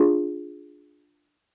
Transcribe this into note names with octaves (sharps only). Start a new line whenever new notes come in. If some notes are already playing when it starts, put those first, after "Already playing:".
Already playing: D4 F4 G#4